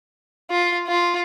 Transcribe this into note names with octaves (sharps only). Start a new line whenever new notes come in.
F4
F4